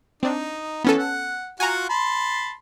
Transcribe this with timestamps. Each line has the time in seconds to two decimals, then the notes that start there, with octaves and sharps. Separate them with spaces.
0.23 C4 D4 D#4
0.84 E3 B3 C#4 A4
0.98 F#5
1.60 F4 F#4 F#5 G#5 A#5
1.89 A5 B5 C6